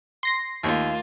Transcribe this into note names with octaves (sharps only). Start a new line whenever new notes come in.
C6 A#6 C7
D#2 A3 A#3 F4